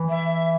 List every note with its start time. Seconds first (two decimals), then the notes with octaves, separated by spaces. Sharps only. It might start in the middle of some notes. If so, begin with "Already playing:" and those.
Already playing: E3
0.09 E5